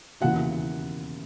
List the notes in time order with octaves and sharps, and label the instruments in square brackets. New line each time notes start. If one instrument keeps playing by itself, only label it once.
[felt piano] E1 D#2 C#3 E3 F#4 F#5